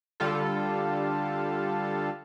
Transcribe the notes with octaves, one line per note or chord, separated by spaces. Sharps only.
D3 G3 F4 A4